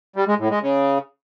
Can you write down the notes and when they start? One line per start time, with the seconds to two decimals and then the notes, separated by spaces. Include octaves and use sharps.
0.16 G3
0.28 G#3
0.39 A2
0.50 G#3
0.62 C#3